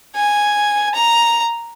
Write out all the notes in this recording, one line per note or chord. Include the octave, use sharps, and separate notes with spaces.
G#5
A#5